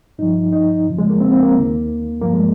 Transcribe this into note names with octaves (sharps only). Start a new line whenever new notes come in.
G2 F3 D#4
D#4
F2 C#3 F3
G#3
A#3
C4
C4
A#3
D#2 D#3
G2 F3 A#3
G#3